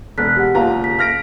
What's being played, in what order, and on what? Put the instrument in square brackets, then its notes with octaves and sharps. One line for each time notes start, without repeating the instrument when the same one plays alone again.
[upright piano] E1 [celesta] F#6 B6
[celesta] G4 F#5
[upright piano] F#1 F4 A#5
[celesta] B6
[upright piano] F6 A#6 D7